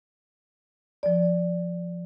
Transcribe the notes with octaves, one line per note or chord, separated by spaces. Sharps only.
F3 D5